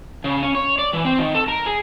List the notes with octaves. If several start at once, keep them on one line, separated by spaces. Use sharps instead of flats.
C#3
C#4
C#5
D5
E3
C4
D#3
A4
A#4
G#4